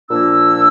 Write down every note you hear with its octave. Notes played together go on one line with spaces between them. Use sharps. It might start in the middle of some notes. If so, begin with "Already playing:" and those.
A#2 F3 A#3 D4 E6